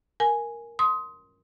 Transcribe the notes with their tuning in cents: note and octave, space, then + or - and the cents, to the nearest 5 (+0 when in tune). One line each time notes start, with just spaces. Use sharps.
A#4 +0 G#5 +0
C6 +0 D#6 +25